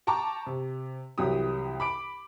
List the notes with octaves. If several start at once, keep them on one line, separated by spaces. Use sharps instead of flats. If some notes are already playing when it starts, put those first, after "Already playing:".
G5 A5 A#5 C#6 D6
C3
C2 E3 F#3 G4 G5 D#6
B5 D6 D7